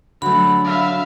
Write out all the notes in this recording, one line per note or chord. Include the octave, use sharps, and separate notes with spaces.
D3 F#3 A3 F#4 B5
E5 F5